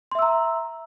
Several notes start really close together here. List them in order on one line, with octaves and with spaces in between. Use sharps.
C6 E5 E6 A#5